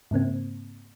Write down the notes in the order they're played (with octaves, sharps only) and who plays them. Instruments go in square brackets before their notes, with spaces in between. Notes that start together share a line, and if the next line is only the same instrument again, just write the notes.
[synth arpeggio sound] G#2 C#3 A#3 C4